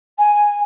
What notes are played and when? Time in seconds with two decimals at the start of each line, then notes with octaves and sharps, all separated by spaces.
0.18 G#5